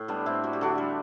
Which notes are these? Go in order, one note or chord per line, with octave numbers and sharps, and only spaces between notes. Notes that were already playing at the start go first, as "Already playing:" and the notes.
Already playing: A2
G3 B3 D4
A2 C4 E4
G3 F#4
G4
D3 D4 F#4
G3